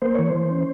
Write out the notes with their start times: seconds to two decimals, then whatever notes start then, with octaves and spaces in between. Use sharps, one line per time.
0.02 A#3 C5
0.15 E3 C#5
0.28 C5
0.34 E3
0.51 C#4